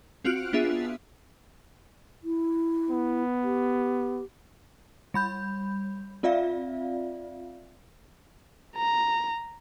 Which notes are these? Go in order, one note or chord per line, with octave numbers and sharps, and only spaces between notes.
C4 F4 F#4 F6 F#6 D7
B3 D4 F4 G#4 E5
E4
B3
G4
G3 B5 G6
C4 F4 D5 E5 F5
A#5